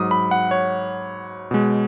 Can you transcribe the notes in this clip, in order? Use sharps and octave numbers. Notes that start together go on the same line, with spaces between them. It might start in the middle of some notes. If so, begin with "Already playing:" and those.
Already playing: G#2 F#3 D#6
B5
F#5
C#5
B2 G#3